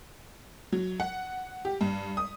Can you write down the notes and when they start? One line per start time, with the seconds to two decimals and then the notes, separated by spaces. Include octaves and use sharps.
0.72 F#3
1.00 F#5
1.65 G4
1.81 G2
2.17 D#6